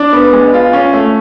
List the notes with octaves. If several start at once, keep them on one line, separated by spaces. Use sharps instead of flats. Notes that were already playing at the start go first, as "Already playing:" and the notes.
Already playing: D4
B3
G#3
F4
C#4
A3